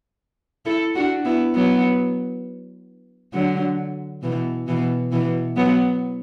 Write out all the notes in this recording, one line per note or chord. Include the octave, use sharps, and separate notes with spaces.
E4 A4
D4 F#4
B3 E4
F#3 B3
D3 F#3
B2 E3
B2 E3
B2 E3
F#3 B3